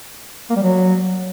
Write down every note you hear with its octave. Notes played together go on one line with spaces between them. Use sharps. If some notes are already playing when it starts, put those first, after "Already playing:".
A#3
G3
F#3